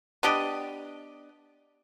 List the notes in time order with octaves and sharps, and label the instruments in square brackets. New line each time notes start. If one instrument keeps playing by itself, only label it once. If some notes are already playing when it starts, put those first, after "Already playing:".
[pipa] B3 D4 G4 D#5